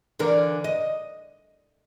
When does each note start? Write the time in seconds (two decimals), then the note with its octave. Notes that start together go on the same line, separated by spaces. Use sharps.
0.19 D3 E3 A#4
0.64 D#5